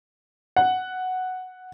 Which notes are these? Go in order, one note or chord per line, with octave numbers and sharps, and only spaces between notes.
F#5